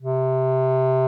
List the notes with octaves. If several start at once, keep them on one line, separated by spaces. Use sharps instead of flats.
C3